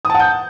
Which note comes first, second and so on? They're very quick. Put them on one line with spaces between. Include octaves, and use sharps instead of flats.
D#6 A5 F#5 G6